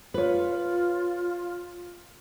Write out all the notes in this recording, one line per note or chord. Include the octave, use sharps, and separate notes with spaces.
F4 B4 C#5